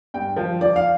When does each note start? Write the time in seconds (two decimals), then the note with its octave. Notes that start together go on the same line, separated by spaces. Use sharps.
0.14 G2 G5
0.37 F3
0.61 F3 D5
0.76 F5